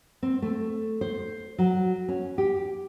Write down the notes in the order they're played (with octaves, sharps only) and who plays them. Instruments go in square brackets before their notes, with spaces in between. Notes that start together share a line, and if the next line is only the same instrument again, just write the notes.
[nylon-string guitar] C4
A3
C5
F#3
C#4
G4